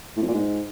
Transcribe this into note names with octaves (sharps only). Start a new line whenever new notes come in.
A2
F2
A#2
G#2